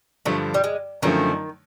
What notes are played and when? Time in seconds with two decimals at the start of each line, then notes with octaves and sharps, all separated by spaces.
0.26 G2 D3 F3 A3
0.54 G3
0.64 G#3
1.02 F#2 D3 D#3 F3 A3